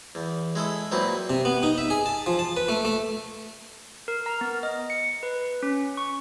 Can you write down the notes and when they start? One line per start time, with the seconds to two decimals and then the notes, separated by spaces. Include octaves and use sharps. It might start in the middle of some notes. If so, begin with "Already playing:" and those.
0.15 E2
0.55 G#3 E4 A4 D#6
0.92 A#2 F#3 C4 E4 B4 D#6
1.30 C3
1.45 B3
1.63 D#4
1.78 E5
1.90 G#4
2.06 A5
2.26 F3
2.39 A5
2.57 B4
2.69 A3
2.85 A3
4.08 A#4
4.26 A#5
4.41 B3
4.63 D#5
4.90 C#7
5.23 B4
5.63 C#4
5.97 C#6